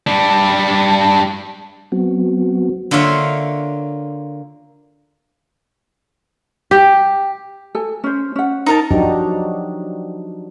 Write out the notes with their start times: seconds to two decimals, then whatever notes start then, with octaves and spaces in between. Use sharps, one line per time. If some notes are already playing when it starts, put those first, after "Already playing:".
0.07 G3 D4
1.92 F#3 B3 C4 F#4
2.91 D3 A#3 F4 C#5 E5 F5
6.71 G4
7.75 A4 G#5
8.04 C#4 C5
8.36 C#4 F#5
8.66 D#4 A#4 A5
8.91 F3 F#3 D4 D#4 F#4 G4